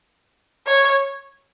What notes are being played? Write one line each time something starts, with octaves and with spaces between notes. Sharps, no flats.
C#5